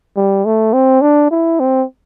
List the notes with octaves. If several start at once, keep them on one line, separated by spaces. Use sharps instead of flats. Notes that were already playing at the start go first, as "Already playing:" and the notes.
G3
A3
C4
D4
E4
C4